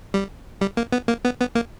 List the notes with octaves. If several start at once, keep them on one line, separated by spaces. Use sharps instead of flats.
G3
G3
A#3
B3
A#3
B3
B3
A#3